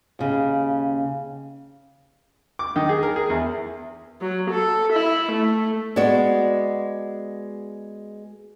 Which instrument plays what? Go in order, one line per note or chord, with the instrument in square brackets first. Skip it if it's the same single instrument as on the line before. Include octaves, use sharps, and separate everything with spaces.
[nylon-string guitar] D#2 C#3
[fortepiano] D6
D#3
G#4
A#4
G#4
E2
[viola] F#3
A4
E4
A3
[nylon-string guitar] G#3 B3 F#4 D5